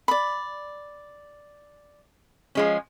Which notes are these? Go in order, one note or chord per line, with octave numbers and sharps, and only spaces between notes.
D5 B5
F3 G#3 C#4